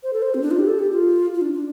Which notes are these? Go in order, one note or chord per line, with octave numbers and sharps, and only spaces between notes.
C5
A4
C5
C4
D4
F4
G4
A4
G4
F4
F4
D4
D4